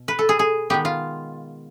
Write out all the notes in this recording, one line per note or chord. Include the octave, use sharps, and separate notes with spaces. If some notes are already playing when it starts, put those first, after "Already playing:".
Already playing: B2
B4
A4
G#4
G#4
D#3 G#3 B3 G4
F4